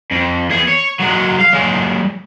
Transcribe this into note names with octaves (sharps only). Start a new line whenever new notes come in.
F2
E2 G#4
C#5
F#3 G#3
F5
F#3 G#3